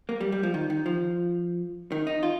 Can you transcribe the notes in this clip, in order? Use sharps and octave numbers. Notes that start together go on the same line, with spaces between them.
A#3
G3
G3
F3
D#3
D#3
F3
D#3
D#4
F4